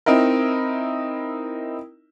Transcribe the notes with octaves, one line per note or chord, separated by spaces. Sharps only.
C4 D#4 E4 A#4